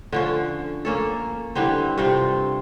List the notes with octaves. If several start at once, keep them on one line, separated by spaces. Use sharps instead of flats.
D3 F3 C#4
A#3 C#4 A4
D3 E3 G3 C4
G2 C3 C4 F4